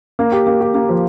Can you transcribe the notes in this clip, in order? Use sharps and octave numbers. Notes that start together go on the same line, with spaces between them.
A#3
G4
A#3
G4
A#3
F3